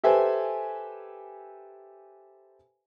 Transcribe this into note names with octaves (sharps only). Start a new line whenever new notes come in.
G4 A4 B4 C5 E5 G#5